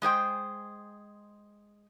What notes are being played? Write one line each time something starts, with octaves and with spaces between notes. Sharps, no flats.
G#3 G#4 C5 G5